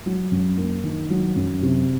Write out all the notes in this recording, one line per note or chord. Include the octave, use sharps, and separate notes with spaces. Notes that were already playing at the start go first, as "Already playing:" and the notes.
F#3
F#2
A#3
D#3
F#3
F#2
C3